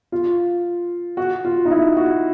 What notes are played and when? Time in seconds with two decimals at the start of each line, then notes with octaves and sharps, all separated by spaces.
0.12 F4
1.17 F#4
1.45 F4
1.65 D#4
1.71 E4
1.97 F#4